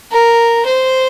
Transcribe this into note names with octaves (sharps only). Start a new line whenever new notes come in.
A#4
C5